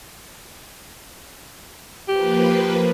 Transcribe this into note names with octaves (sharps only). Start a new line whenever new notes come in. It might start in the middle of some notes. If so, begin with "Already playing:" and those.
F3 A#3 G4 B4